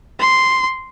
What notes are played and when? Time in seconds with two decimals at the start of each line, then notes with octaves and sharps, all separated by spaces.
0.20 C6